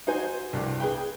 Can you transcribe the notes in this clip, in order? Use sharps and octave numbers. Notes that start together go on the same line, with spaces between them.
D#4 F#4 C5 G#5
C2 G2
G#4 B4 G5